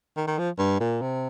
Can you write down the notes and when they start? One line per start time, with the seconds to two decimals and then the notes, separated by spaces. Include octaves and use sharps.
0.17 D#3
0.27 D#3
0.38 F3
0.58 G2
0.80 A#2
1.01 C3